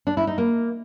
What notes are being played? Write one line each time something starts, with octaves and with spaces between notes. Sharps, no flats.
D4
E4
D#4
A#3